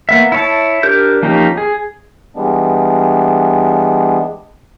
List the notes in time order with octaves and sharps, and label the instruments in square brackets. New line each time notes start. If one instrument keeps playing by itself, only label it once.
[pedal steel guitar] A#3 B3 E5
E4 C#5 A5
D4 G4 A#4 G6
F3 A#3 C#4 D#4 G4
G#4
[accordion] E3 G3 G#3 B3 D4